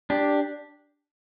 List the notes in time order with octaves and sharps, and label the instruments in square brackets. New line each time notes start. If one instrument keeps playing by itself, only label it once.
[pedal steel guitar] D4 G4